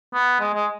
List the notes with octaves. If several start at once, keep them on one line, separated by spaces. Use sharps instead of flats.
B3
G#3
G#3